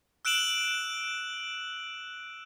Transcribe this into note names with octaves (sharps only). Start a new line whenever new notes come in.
E6 F#6 D7 E7 F#7